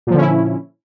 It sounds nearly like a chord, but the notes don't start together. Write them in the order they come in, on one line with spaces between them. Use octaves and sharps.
A#2 F3 D3 C#4 E4